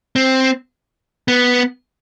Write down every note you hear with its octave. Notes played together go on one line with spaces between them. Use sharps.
C4
B3